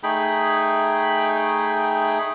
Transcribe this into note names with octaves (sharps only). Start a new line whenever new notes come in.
A3 D#4 G#4 G5 B5